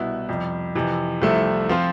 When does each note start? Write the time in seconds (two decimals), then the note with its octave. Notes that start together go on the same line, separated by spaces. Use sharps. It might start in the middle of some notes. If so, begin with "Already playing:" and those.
Already playing: C2 B2 B3 E4
0.29 F2 C3 G3
0.75 F2 C3 E3
1.22 C2 C3 F3 A3 E4
1.69 F3 C4 F4